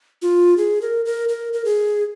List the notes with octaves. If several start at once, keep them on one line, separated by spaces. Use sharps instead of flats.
F4
G#4
A#4
A#4
A#4
A#4
G#4